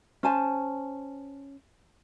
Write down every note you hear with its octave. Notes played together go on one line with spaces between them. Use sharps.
C#4 C5 G#5 A5